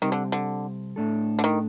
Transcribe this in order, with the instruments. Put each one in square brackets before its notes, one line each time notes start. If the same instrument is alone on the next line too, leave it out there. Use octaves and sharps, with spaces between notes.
[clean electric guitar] C3 G3 C4 [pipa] D#3
[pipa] D3
D3
[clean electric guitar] A2 A3 D4 A4
[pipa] D3
D#3